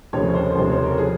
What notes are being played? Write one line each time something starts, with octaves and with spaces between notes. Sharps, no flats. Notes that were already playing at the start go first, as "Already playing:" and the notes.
F1 D#2 C#3 F3 C#5
C5
F1 D#2 C#3 F3 C5
C#5
A#4
F3 G#4